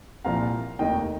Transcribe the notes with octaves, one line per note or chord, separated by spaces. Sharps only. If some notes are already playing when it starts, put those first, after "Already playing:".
C2 A#2 F3 F5 A#5
F1 D#2 D#3 D#5 G5